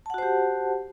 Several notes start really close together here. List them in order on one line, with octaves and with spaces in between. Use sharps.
A5 F#5 F#4 C5 G4